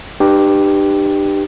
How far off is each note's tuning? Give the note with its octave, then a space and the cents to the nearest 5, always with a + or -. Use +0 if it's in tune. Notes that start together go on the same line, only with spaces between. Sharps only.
D4 +45 G4 +0 B4 +0